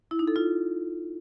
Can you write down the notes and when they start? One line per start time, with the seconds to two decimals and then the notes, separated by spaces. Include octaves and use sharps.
0.11 E4
0.19 D#4
0.28 A4
0.36 F4